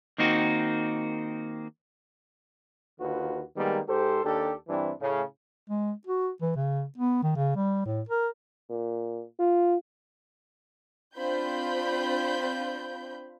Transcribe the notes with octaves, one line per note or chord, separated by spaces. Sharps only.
D#3 A#3 C4 D#4 F#4
D#2 D3 F4 F#4 B4
D#3 G3 G#3 A#3 B3
G#2 G4 A4 C5
D#2 D4 G4 A4
G2 E3 C4 D4 E4
A2 C#3
G#3
F#4
E3
C#3
B3
D#3
C#3
G3
A2
A#4
A#2
F4
C4 D4 F4 C5 B5 G6